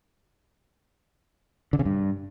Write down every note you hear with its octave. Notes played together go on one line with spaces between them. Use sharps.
D3
C#3
G2